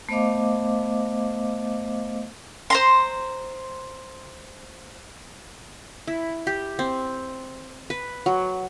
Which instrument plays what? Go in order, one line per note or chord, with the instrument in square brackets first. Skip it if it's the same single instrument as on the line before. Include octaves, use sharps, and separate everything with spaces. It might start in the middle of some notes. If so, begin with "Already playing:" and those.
[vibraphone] A3 B3 C5 D#5 F5 D6
[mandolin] C5 A#5 C6
[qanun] E4
G4
C4
B4
F#3